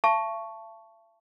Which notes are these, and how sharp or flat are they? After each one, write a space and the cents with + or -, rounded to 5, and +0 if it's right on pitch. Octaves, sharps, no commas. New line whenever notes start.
E5 +45 A5 +0 C#6 +0